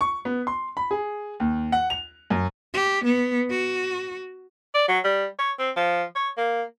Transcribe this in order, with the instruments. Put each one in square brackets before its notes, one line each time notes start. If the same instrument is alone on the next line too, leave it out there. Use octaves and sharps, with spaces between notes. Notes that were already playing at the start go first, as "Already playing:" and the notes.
[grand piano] C#6
B3
C6
B5
G#4
D#2
F#5
F7
F#2
[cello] G4
B3
F#4
[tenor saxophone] D5
F#3
G3
C#5
C4
F3
C#5
A#3